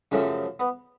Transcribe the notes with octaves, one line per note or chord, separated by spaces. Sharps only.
F#2 C#3 F3 A3 C#4
B3